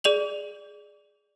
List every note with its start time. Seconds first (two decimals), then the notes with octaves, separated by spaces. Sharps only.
0.04 G#4 D5 F7 F#7